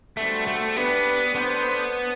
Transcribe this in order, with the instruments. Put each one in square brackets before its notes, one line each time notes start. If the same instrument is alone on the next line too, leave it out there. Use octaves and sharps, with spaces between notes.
[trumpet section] G3 B3 D4 F#4 C5 [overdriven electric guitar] A3
[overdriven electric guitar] A3
[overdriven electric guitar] B3 [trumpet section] D4 G4 B4
[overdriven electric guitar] B3 [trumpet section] D4 A4 C5